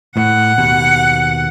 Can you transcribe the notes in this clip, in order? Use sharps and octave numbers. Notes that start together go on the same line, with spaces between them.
A2 F#5
D#2 B2